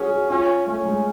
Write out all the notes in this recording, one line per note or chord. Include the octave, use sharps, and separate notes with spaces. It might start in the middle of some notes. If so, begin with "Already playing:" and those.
Already playing: C#4 F#4 G#4
F#4
C#4 F4
A3 C#4
G#3